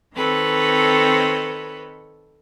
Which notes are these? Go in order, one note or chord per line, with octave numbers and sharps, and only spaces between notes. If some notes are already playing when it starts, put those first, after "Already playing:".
D#3 C4 A4 B4 C#5